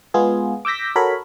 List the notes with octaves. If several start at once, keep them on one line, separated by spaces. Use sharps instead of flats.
G#3 B3 F4 G#4
D6 E6 G6 A#6 B6
F#4 A4 A#4 C#5 B5